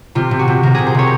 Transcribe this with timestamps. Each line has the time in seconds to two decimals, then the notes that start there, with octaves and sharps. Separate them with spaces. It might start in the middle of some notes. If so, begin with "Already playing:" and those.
0.15 C3 F4
0.31 C3
0.39 F#4
0.48 C3
0.63 C3 A#4
0.74 C3 G#4
0.87 C5
0.95 C3 C#5